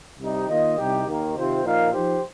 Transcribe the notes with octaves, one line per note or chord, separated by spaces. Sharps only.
C2 C3 G3 D#4 G4
D#3 A#3 F4 D#5
C2 C3 G3 D#4 G4
D#2 D#3 A#3
C3 D#3 C4 F4 C5
A#2 F3 D#4 A#4 F5
F3 D#4 G4 C5